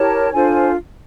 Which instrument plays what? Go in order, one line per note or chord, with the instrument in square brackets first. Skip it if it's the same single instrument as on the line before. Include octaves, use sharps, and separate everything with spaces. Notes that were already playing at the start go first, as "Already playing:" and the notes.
Already playing: [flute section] E4 G4 A#4 C#5 A5
D4 F4 A4 C5 G#5